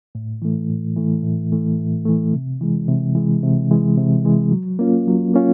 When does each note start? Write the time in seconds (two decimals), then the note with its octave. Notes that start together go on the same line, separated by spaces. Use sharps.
0.15 A2
0.42 E3 A3
0.70 A2
0.96 E3 A3
1.23 A2
1.52 E3 A3
1.79 A2
2.05 E3 A3
2.34 C3
2.61 E3 G#3
2.88 C3
3.15 E3 G#3
3.43 C3
3.71 E3 G#3
3.97 C3
4.25 E3 G#3
4.52 F#3
4.79 A#3 C#4 F4
5.08 F#3
5.34 A#3 C#4 F4